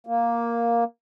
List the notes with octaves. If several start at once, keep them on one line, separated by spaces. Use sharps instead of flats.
A#3